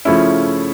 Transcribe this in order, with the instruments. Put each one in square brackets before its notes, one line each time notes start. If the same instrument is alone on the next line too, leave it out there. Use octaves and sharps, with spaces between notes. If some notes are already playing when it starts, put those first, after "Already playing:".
[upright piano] C#3 F3 A3 C#4 E4